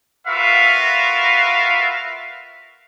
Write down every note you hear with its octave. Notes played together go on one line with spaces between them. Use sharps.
F4 F#4 A#4 B4 E5 F5